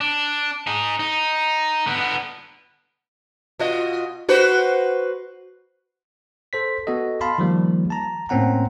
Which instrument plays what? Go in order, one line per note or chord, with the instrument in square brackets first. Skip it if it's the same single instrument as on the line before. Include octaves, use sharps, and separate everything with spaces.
[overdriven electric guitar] D4
D#4 G#4
D#4
D3 B3
[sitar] B2 F4 D#5
F#4 B4 C5
[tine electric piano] A4 C5 B6
B3 F#4 A4 D#5
F5 A5 B5 C6
D#3 F3 G3 A#3
A5 A#5
A2 A#3 C4 C#4 F#5 A#5